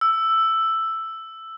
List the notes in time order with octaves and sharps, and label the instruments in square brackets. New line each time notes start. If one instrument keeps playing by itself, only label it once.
[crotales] E6